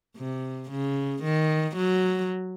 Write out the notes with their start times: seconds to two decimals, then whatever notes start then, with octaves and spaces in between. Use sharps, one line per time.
0.17 C3
0.70 C#3
1.23 D#3
1.76 F#3